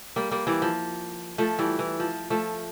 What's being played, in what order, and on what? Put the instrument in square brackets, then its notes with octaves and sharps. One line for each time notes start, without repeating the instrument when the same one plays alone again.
[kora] G3 A#3
G3 A#3
E3 G3
F3
F3 A3
E3 G3
E3
F3
F3 A3